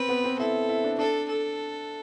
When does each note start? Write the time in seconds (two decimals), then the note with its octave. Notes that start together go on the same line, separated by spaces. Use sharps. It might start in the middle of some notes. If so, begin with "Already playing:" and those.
Already playing: C4 B4
0.09 B3
0.24 C4
0.39 E4 A4
0.69 E4
0.84 D4
0.98 D4 A4
1.28 A4